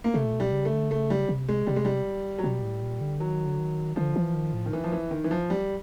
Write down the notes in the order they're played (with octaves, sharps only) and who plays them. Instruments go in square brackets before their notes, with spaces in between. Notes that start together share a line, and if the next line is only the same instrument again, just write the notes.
[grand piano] A#3
[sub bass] C3 [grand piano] A3
[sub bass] A#2
B2
[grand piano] G3
[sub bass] C#3
[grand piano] A3
[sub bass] D3
[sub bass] C#3 [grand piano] A3
[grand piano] G3
[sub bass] C3
[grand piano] G#3
[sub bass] C3 [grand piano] G3
[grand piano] G#3
G3
F#3
[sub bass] B2 [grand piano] G3
[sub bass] A2
A#2
D3
[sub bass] D#3 [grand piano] F#3
[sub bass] D3
D#3
[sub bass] D3 [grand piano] F3
[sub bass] E3
D#3
A2
[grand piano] D#3
E3
F3
E3
D#3
E3
F3
G3